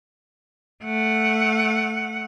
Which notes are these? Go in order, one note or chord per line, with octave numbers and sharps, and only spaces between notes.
A3 F#5